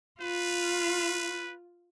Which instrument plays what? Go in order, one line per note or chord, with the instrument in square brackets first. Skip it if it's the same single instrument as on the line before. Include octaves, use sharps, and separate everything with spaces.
[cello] F4 [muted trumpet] B4